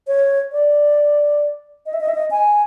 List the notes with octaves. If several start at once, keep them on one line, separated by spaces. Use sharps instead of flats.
C#5
D5
D#5
E5
D#5
E5
D#5
G#5